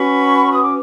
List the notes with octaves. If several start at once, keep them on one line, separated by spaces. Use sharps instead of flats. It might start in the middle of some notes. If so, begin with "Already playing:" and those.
Already playing: C#4 F#4 B4 B5 C#6
D#6
D6